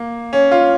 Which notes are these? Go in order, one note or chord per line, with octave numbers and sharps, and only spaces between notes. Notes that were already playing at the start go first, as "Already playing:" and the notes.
Already playing: A#3
C#4
F4